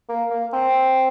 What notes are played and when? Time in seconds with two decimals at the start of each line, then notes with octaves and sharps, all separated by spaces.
0.09 A#3
0.31 A#3
0.53 C4